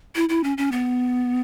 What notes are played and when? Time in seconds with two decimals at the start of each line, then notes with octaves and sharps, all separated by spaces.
0.15 E4
0.29 E4
0.44 C#4
0.58 C#4
0.72 B3